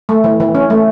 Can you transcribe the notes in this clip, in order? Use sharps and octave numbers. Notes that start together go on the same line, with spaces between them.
A3
E3
E3
C#4
A3